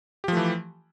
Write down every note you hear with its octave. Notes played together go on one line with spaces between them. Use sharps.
E3 F3 A3 G4